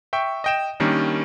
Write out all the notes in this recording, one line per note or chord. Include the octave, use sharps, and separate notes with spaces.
E5 G5 C#6
D#5 G5 E7
D#3 G3 A#3 C#4 D4